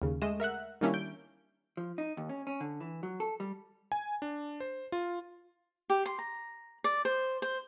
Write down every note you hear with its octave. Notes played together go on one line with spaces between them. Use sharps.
D#2 C#3
G#3 A3 D#5 E7
A#4 E5 F#5 F#6
D#3 G3 A#3 C#4 D4 E4
G6 D7
F3
D#4
D#2
C#4
C#4
D3
E3
F#3
A4
G3
G#5
D4
C5
F4
G4
C6
A#5
D5
C5
C5